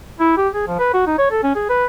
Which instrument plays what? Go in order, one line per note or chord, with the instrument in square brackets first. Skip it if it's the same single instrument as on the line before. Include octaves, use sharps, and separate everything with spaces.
[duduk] E4
G4
G#4
F3
B4
F#4
D#4
C#5
A4
C#4
G#4
B4